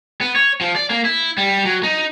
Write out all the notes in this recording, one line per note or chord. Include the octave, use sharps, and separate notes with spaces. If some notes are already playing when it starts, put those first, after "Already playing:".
B3
C#5
F3
D5
A#3
E4
G3
F#3
D#4